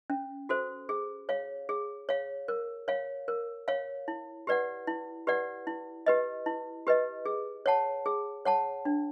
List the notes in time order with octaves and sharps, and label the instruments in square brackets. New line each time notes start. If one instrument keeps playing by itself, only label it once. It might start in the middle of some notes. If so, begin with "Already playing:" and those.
[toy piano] C#4
F#4 A4 C5
G#4
C#5 F5
G#4
C#5 F5
A#4
C#5 F5
A#4
C#5 F5
E4
G4 B4 D5 F#5
E4
G4 B4 D5 F#5
E4
G4 B4 D#5
E4
G4 B4 D#5
G#4
C#5 F#5 A5
G#4
C#5 F#5 A5
D4